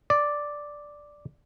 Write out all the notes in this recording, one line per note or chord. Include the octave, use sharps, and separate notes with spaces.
D5